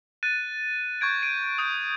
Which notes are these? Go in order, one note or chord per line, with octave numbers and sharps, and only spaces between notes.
F#6 A6 D#7
C#6 G6 G#6 D7
D7 D#7
D#6 G6 D7